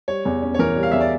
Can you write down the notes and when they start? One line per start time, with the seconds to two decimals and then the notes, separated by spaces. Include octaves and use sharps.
0.08 G3 C#5
0.25 E2
0.43 C#4
0.54 C#5
0.59 E3 A#4
0.76 G3
0.83 F5
0.92 E2 E5
1.01 D5